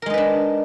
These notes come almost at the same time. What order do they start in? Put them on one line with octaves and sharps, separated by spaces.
A#4 G#3 D#4 B4 D4